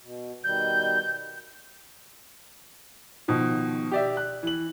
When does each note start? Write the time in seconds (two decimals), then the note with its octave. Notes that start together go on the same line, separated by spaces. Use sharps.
0.01 B2
0.44 B2 D#3 G3 G6
3.28 B2 D#3 F3
3.91 G4 D5 E5
4.17 F#6
4.43 E3 F#7